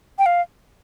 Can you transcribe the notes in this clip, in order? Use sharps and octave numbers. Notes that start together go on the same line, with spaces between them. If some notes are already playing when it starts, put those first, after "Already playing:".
G5
F5